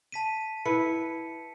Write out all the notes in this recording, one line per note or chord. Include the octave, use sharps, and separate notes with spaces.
A5 B6 D#7
E4 B4 C#7